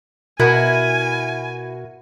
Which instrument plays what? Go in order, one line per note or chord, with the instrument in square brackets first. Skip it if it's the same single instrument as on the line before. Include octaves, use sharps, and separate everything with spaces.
[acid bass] B2 [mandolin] E4 [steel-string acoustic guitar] F#4 A#4 [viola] G#5